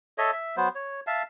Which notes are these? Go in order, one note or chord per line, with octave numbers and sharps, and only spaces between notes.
A4 C#5 D#5 E5
E5
F#3 B3 C5
C#5
E5 F5 A5